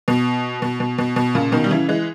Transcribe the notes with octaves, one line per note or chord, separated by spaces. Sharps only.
B2
B2
B2
B2
B2
A#2 C#3
B2 D#3
G3
C#3 E3
E3 G#3